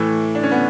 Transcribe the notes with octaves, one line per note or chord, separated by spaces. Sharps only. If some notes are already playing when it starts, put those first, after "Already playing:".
Already playing: A2 E3 A3
D4
C#4
B3